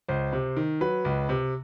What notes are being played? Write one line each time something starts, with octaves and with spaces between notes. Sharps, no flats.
C#2 C5
C3
D#3
F#3 B4
C#2
C3